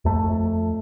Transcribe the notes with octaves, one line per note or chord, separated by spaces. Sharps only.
F2 A3